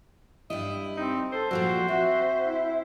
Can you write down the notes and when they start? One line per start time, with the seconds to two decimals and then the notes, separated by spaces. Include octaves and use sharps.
0.50 G2 G3 E4 D#5
0.97 C4 D#4
1.32 A4 C5
1.51 A#2 F3 G3 F#4
1.88 C4 F#4 E5
2.44 E4